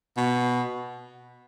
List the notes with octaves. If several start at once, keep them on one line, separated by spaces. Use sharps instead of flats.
B2